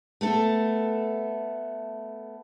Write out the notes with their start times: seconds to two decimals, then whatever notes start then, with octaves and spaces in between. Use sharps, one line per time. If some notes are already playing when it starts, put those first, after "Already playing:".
0.21 A3 B3 A4